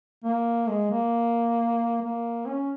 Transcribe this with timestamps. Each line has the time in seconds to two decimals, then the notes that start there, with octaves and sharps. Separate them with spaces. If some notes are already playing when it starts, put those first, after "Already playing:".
0.24 A#3
0.68 G#3
0.91 A#3
2.02 A#3
2.46 C#4